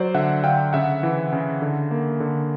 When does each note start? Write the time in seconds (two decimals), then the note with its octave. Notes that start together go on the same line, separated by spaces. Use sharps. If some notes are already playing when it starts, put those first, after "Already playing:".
Already playing: F#3 C5 D5
0.14 D3 E5 F#5
0.44 D3 F5 G5
0.73 C#3 E5 F#5
1.03 E3
1.33 C#3
1.62 D3
1.91 A#3
2.20 D3